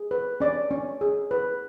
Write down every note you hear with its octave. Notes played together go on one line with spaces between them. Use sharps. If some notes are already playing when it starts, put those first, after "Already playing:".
Already playing: G#4
B4
C#4 D5
C#4
G#4
B4